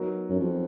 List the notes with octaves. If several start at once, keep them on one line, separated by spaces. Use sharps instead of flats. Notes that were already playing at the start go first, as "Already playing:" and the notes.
Already playing: F#3 B3 D#4 A#4
F#2
F2